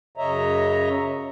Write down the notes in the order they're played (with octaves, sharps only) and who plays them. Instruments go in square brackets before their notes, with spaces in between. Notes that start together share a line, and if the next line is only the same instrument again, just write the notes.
[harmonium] F#2 C#3 C#5 D#5 E5 A#5